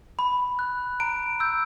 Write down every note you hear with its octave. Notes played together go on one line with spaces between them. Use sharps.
B5
F#6
A#5 D7
E6 G6